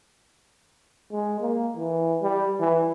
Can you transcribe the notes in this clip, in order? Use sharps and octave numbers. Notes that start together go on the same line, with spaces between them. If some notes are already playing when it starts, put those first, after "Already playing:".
G#3
A#3
E3
G3
E3